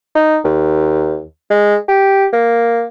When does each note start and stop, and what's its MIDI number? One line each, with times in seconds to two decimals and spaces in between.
0.15 0.39 63
0.45 1.22 39
1.50 1.77 56
1.88 2.26 67
2.33 2.84 58